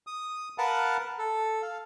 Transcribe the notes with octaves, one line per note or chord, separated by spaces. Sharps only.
D#6
A#4 B4 F5 F#5 A5
A4
F5